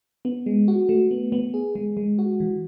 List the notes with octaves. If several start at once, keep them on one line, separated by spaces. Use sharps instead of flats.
B3
G#3
F#4
A3
B3
B3
G#4
G#3
G#3
F#4
E3